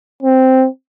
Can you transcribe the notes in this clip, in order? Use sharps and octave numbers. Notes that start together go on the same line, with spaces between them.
C4